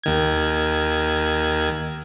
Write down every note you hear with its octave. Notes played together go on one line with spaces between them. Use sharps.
D#2 D#3 G#6